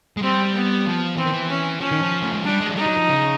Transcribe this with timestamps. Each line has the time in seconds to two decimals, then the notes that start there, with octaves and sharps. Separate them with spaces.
0.17 G#3
0.22 G3 C4
0.54 B3
0.86 F3
1.17 E3 C4
1.25 D#3
1.33 E3
1.49 C#4
1.80 F3 C#4
1.91 D#3
2.02 F3
2.22 A3
2.34 G#3
2.44 G3 D4
2.60 G#3
2.69 F#3
2.76 G3 D#4
2.86 F#3
2.97 F3
3.08 C#3